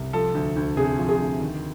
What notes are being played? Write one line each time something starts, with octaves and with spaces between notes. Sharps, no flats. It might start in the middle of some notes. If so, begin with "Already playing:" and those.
Already playing: C2
F3 A4
D2
D2
C3 G#4
F3
G#4
D2
D#3